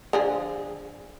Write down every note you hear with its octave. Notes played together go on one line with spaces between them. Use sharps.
D3 F3 G#4